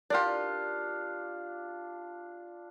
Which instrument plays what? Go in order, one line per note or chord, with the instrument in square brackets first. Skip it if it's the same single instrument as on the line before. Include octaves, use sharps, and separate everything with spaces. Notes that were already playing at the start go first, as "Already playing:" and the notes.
[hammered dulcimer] D4 F4 [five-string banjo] G4 A#4 D5